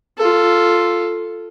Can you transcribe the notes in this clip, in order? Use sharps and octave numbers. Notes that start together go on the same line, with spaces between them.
F4 A4